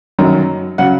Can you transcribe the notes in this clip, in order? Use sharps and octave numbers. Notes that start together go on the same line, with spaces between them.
F#2 D#3 F#3 A#5
C#3 F#3 F#5